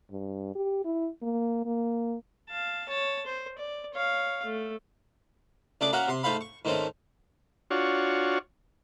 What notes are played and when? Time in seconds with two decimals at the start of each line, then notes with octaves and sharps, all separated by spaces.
0.11 G2
0.55 G4
0.85 E4
1.23 A#3
1.66 A#3
2.50 F5 A5
2.89 C#5 A5
3.26 C5
3.58 D5
3.94 C#5 F5
4.45 A3
5.81 C#2 A3 D4 G#4 D6
5.93 A#3 C#4 F#4 A#4 E5 F#5
6.08 C3 C6
6.23 G#2 A3 C5 F5 B5
6.41 C#6
6.65 G#2 D#3 A3 C4 C#4
7.71 D4 F4 F#4 C#5